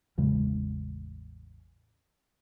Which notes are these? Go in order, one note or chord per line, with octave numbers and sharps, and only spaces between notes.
A1 E2 C#3 G#3